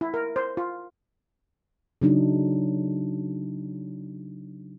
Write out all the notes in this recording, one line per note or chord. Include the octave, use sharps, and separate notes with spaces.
E4
A#4
C5
F4
C#3 F#3 D4 D#4